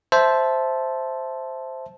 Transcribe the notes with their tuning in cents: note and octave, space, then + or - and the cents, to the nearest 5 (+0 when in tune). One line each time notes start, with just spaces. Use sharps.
C5 +0 E5 +0 A5 -10